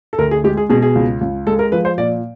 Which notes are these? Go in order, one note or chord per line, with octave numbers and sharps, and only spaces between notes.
A4
D2 A#4
G#4
G#3 G4
G#4
B2 G#4
G#4
C#2
C#2
G#3 A4
A#4
F3 B4
C5
A#2 D5